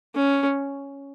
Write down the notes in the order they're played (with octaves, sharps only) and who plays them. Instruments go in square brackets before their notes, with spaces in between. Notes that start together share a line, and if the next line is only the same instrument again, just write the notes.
[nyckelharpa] C#4